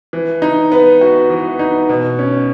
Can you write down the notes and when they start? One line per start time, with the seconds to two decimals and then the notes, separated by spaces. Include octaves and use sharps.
0.13 E3
0.42 D#4
0.72 B3
1.01 F#4
1.30 E3
1.59 D#4
1.89 B2
2.19 C#4